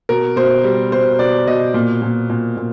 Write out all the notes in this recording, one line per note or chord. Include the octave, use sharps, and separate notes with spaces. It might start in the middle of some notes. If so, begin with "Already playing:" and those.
B2 A#4
B2 C5
G3
B2 C5
B2 D5
B2 D#5
A#2
A#2
A#2
A#2